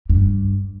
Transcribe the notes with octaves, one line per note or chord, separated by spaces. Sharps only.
G2